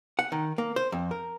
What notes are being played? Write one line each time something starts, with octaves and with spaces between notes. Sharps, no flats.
F#5
D#3
A#3
C5
F2
A#4